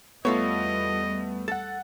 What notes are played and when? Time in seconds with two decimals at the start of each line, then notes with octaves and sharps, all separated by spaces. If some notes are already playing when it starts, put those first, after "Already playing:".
0.25 E2 G3 A3 B3 F4 A4 C#5 D#5
1.48 A4 F#5 A6